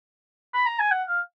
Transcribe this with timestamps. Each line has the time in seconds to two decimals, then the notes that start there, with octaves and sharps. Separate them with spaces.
0.54 B5
0.66 A#5
0.79 G#5
0.91 F#5
1.08 F5